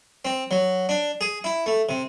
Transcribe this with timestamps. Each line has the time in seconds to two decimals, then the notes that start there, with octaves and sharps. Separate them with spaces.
0.25 C4
0.51 F#3
0.89 D4
1.21 G#4
1.44 E4
1.66 A3
1.89 C3